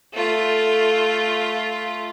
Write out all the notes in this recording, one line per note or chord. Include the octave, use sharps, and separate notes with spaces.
A3 F4